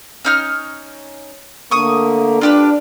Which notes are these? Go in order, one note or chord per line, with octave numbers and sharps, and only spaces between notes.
C#4 D#4 F6
D3 A3 A#3 C#6 D#6
D4 F4 G4 B4